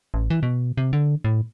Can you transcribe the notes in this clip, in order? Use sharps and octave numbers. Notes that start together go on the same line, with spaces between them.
A1
E3
B2
C3
D3
A2